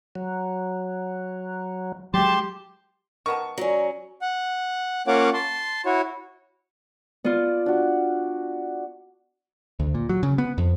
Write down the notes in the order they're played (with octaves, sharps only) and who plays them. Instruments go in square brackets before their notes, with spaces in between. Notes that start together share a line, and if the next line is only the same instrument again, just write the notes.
[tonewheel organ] F#3
[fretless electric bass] F#3 G#3 [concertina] G4 C6 [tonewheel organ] A5
[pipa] D#3 B3 A5 [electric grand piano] C#6
[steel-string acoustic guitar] F#3 C#4 [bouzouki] A#4 D5
[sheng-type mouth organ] F#5
A#3 C#4 F4 C#5 F#5 D6
A5 C6
E4 F#4 C#5
[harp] B3 F4 [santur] D5
[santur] D4 F#4
[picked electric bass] D2
A#2
F#3
C#3
B3
F2